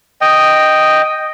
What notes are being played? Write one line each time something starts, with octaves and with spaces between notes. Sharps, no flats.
D#5 G5